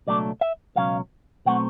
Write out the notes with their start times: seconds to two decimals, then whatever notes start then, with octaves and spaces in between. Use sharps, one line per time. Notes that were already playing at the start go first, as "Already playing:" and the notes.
0.07 C#2 B2 F#3 A3 D4 D5
0.41 E5
0.76 C#2 B2 F#3 C#4 F5
1.45 B2 F#3 A3 C4 F#5